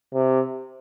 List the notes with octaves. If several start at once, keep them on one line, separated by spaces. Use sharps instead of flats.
C3